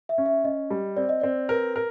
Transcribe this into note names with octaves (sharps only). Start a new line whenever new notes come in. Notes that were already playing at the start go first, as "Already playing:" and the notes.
E5
C#4
E5
C#4 D#5
G3
C4 D5
D#5
C4 D5
A#4 B4
A#4